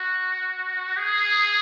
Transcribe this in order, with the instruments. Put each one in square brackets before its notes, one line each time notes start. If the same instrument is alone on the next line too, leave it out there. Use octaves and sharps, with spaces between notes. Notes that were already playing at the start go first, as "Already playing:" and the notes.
Already playing: [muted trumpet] F#4
G#4